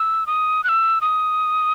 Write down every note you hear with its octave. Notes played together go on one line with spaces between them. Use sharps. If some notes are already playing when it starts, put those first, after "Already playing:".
Already playing: E6
D#6
F#6
E6
D#6